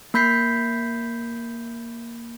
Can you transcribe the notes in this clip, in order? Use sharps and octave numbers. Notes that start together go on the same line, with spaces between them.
A#3 B5 G6 B6 C7